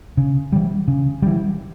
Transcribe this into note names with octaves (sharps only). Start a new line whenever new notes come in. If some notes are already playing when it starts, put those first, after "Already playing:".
C#3
E3 G3
C#3
E3 G3